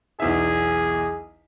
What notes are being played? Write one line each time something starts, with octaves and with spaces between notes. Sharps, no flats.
B1 E2 G#4 E5